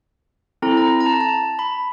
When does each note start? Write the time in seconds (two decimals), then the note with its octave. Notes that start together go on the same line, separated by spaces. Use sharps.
0.62 C4 E4 A4 A#5
0.77 A#5
1.00 A#5
1.06 A5
1.21 A5
1.59 B5